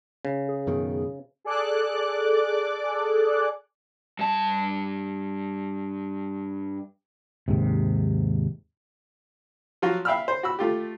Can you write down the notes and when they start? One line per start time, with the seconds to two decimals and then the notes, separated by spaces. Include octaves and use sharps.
0.25 C#3
0.48 G#4
0.67 F#2 B2 D#3
1.45 G#4 A4 D5 D6 F#6
4.19 G2 A5
7.48 D#2 G#2 C3
9.82 F3 F#3 F4 F#4
10.05 E5 F5 G5 B5 E6 F6
10.28 C5
10.43 F#4 B5 E6
10.59 A3 F4 G4